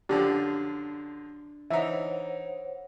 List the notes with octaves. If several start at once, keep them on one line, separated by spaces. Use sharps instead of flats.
F#2 D3 F3 D4 G4
E3 D#4 C5 C#5 E5 F#5 A#5